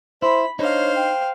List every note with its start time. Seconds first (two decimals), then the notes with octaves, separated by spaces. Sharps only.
0.22 E4 C5 B5
0.59 D4 D#4 C5 C#5 F5
0.96 G5